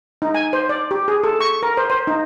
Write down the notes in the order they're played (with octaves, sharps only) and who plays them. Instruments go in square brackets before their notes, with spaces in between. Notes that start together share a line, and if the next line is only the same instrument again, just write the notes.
[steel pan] D#4
G#5
C5
D5
G4
G#4
A4
C#6
A#4
C5
C5
D#4